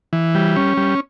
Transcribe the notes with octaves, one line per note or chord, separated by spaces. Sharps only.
E3
G3
C#4
G3